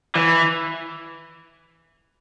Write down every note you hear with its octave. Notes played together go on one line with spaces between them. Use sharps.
E3